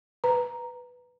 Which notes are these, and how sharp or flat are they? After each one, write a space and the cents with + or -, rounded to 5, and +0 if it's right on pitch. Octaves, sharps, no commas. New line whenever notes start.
B4 +0 A#5 +0